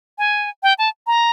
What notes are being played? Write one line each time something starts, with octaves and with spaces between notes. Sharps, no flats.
G#5
G5
A5
A#5